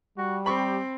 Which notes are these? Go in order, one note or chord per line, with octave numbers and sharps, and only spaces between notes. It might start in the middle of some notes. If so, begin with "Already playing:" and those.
G3 F#4
C4 G4 B5 C#6